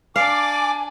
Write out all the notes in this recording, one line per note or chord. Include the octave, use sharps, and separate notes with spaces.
D4 D5 F5 G#5 D6